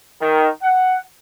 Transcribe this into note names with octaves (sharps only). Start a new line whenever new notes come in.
D#3
F#5